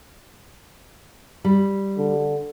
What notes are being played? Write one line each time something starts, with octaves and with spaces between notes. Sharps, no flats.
G3
D3